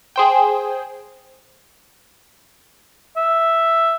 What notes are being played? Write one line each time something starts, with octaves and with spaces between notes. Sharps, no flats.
G#4 C5 G5
E5